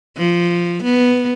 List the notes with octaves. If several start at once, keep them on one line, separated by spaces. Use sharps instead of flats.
F3
B3